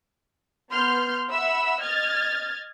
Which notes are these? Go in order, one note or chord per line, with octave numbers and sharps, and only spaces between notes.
B3 C6 F6 G6
E5 F#5 B5 E6
D#5 F6 G#6 A6